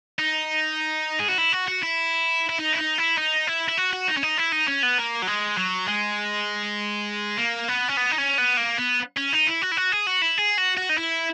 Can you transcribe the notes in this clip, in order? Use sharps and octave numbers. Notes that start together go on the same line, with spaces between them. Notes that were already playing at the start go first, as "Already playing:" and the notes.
D#4
G#4
F#4
E4
F#4
F#4
E4
E4
D#4
E4
D#4
E4
D#4
E4
E4
F#4
F#4
D#4
C#4
D#4
E4
D#4
C#4
B3
A#3
F#3
G#3
F#3
G#3
A#3
B3
C#4
B3
D#4
C#4
B3
A#3
B3
C#4
D#4
E4
F#4
E4
F#4
G#4
F#4
E4
G#4
F#4
F#4
D#4
E4